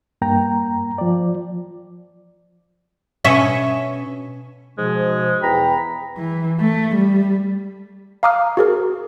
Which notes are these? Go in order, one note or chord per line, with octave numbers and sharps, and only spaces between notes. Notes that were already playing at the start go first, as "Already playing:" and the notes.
G2 A#3 G5 A#5
F3 D5
B2 C#4 E5
G#2 B2 F3 G#3
E2 G5 A#5 B5
E3
A3
G3
F5 A#5 D6 D#6 F6
F#4 G#4 A#4